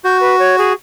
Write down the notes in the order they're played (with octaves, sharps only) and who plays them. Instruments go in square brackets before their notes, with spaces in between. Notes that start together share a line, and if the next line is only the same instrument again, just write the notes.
[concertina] F#4 [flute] G6
[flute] B4
C#5
G#4